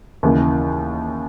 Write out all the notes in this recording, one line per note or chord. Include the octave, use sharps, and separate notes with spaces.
D#2 C#3 E3